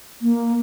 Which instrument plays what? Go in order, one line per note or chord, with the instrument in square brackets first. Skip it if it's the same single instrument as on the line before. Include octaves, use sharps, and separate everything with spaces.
[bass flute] A#3